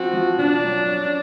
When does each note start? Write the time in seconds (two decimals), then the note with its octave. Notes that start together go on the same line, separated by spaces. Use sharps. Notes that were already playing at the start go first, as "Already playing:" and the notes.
Already playing: F3 C4 F#4
0.13 F3
0.38 B2 D4
0.64 F#3
0.88 C#4